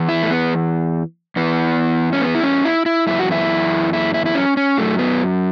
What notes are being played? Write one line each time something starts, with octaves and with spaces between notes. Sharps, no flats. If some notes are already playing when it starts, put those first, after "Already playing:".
Already playing: E2 E3
E4
A3
B3
E2 E3 B3
C#4
B3
E4
C#4
E4
E4
F#2 E3 E4
F#4
E4
E4
E4
E4
C#4
C#4
F#2 F#3 A3
B3